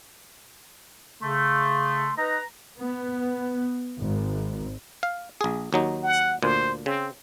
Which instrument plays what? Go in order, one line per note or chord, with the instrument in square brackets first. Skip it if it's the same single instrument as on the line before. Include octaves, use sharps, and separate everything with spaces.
[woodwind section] C#3 A3 [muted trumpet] C6
[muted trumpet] D#4 [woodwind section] B4 A#5
[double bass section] B3
G#1
[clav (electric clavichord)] F5
A#1 G#4
D#2 F#3 D#4
[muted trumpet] F#5
[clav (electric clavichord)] D2 A#2 [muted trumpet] C5
[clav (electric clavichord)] C#3 [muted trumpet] C4